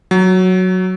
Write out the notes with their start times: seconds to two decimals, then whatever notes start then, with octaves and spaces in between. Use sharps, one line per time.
0.11 F#3